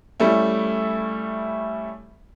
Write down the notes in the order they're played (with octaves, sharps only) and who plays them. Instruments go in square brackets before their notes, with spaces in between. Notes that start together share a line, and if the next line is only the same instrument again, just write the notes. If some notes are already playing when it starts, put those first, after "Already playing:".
[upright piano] G3 A3 C#4 E4